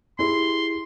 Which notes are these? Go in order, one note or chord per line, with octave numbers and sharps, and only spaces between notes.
E4 G4 G#4 C6